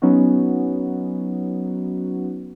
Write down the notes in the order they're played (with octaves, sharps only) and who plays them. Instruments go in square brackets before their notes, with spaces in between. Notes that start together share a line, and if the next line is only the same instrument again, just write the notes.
[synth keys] F#3 B3 C#4 D#4 F#4